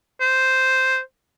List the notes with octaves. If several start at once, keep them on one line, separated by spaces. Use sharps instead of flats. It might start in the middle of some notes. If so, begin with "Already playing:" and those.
C5